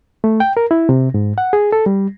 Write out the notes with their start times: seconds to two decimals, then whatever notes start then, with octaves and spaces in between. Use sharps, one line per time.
0.24 A3
0.40 G5
0.57 A#4
0.71 E4
0.89 C3
1.14 G#2
1.38 F#5
1.53 G#4
1.73 A4
1.86 G3